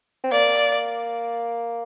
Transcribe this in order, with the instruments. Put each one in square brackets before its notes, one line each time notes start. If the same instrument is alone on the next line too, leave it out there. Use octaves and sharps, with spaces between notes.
[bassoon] C4
[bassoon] A#3 [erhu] D5